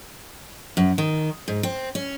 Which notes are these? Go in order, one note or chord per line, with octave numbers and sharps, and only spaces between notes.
F#2
D#3
G#2
C4
C#4